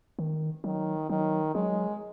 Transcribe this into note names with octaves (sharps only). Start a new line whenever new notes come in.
D#3
D#3 F#3
D#3 F#3
F#3 G#3